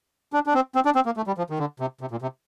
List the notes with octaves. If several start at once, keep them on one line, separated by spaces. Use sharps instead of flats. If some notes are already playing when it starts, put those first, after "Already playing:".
D4
D4
C4
C4
D4
C4
A#3
A3
G3
F3
D#3
D3
C3
C3
A#2
C3